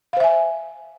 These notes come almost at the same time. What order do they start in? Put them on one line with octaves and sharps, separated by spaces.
F5 C5 E5 G#5